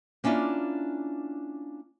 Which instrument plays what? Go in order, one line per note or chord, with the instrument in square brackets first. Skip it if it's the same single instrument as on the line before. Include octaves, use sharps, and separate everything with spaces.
[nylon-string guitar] A#3 C#4 D4 E4 F4